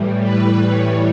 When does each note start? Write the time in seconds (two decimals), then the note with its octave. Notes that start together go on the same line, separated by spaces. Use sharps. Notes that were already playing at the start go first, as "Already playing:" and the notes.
Already playing: A2 E3 G3
0.23 B4
0.67 C#5